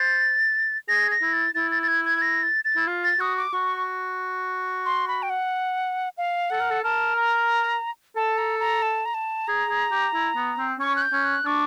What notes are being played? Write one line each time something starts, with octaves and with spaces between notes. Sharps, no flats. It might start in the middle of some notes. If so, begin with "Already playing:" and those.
Already playing: C5 A6
G#4 A#6
A#6
E4
A6
E4 A6
A6
A6
G#6
G#6
A#6
A6
A6
E4
F4
A6
F#4 D#6
D6
F#4 C#6
C6
B5
G5
F#5
F5
A4 F#5
A#4
A4
A#4 A5
A#5
A4 A5
A#5
A#5
A5
A#5
A5
G#4 A#5
G#4
G4
E4
B3
C4
C#4 C#6
F#6
G6
C#4
F#6
D4 C#6